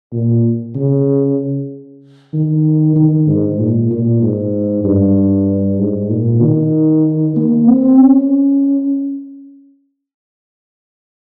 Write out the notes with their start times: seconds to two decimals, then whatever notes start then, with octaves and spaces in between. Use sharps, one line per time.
0.13 A#2
0.76 C#3
2.34 D#3
2.96 D#3
3.28 G#2
3.59 A#2
3.91 A#2
4.22 G#2
4.84 G2
5.79 G#2
6.10 A#2
6.42 D#3
7.37 A#3
7.67 C4
7.99 C#4